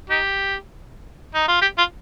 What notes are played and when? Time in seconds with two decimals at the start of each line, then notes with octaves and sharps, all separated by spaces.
0.10 D#4 G4
1.34 D#4
1.48 F4
1.61 G4
1.78 F4